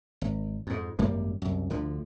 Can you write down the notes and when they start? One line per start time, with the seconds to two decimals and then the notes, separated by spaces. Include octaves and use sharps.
0.22 G#1
0.67 F2 G#2
0.99 G#1 F#2 G3 A#3
1.42 C2 F#2
1.70 D2 D3 F3